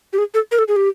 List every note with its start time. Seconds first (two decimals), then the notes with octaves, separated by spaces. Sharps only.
0.13 G4
0.18 G#4
0.34 A4
0.52 A#4
0.59 A4
0.68 G#4
0.76 G4